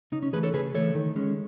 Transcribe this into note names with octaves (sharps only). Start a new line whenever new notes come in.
C#3 D#4
C#4
E3 A3 G#4 B4
A4 C#5
C#3 G#4 B4
E3 A3 A4 C#5
D#3
G#3 C#4